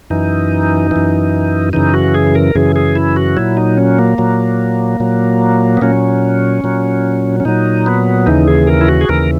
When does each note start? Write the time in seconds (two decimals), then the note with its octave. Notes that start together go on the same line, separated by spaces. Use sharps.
0.10 F#2 E3 D#4
0.91 F#2 E3
1.73 F#2 C#3 E3 D#4
1.94 F#4
2.14 G#4
2.35 A#4
2.55 F#2 C#3 E3 G#4
2.76 G#4
2.96 E4
3.16 F#4
3.37 A#2 F#3 E4
3.57 D#4
3.77 C#4
3.99 A#3
4.18 A#2 F#3
5.00 A#2 F#3
5.77 B3
5.82 A#2 F#3 C#4
6.64 A#2 F#3
7.40 C#4
7.45 A#2 F#3 D#4
7.86 B3
8.26 D#2 C#3 E3 D#4
8.48 G#4
8.67 A#4
8.81 E4
8.88 F#4
9.01 G#4
9.09 D#2 C#3 E3 A#4